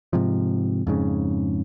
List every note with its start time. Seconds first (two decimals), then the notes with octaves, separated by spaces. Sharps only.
0.13 G#2 C3 F3
0.87 F2 G#2 C#3